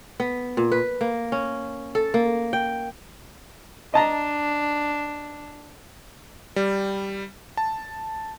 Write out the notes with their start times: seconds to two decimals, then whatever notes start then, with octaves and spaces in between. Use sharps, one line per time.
0.20 B3
0.57 A#2
0.72 B4
1.01 A#3
1.32 C#4
1.95 A4
2.14 A#3
2.53 G5
3.94 D4 D#5 A5 A#5
6.56 G3
7.57 A5